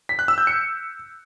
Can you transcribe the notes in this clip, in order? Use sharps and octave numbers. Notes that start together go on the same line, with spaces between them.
B6
F#6
E6
G6
C#7